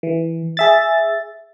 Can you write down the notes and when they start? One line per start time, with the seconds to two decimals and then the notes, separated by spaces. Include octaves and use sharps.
0.03 E3
0.57 G#4 E5 A6